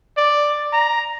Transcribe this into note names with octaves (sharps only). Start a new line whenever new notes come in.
D5
A#5